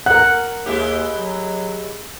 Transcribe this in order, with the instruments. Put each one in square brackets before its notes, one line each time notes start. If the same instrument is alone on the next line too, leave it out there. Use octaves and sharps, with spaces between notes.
[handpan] A#4 F#5 [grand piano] F#6
[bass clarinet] D#2 [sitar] G#3 E4 G4
[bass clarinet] F#3